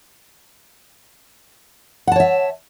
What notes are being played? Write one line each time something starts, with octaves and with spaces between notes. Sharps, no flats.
C#5 E5 F#5 A5